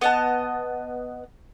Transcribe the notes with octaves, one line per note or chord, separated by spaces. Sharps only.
B3 D#5 A5